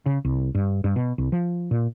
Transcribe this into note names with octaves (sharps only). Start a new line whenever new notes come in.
C#3
C2
G2
G2
B2
C2
F3
A#2